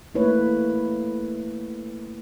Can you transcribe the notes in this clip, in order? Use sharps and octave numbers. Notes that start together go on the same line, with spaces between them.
A3 A#3 E4 B4 C#5